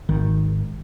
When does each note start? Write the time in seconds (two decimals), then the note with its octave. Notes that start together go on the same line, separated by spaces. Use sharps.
0.09 G#1 D#3